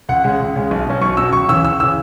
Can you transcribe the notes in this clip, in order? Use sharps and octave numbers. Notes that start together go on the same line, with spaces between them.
C#2 F#5
C#3 G#3
C#2
C#3 G#3
B1
B2 F#3 C#4
B1 C#6
B2 F#3 C#4 E6
C#2 C#6
C#3 E3 E6
C#2 E6
C#3 E3 E6